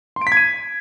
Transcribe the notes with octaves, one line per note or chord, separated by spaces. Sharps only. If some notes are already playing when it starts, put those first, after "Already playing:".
C6
D7
B6
G#6
D#7